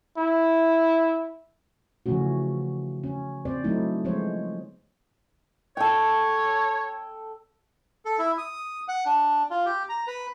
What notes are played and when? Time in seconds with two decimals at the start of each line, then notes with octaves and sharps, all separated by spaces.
0.17 E4
2.06 C#3 E3 F3 A3 C#4 F#4
3.04 C#4
3.45 C4 C5 D5
3.64 D3 F#3 A3 D#4 E4
4.05 F3 G#3 B3 C5 C#5
5.77 A4 C#5 G5
8.05 A4
8.19 E4
8.38 D#6
8.88 F#5
9.06 D4
9.50 F4
9.66 G4
9.89 A#5
10.07 B4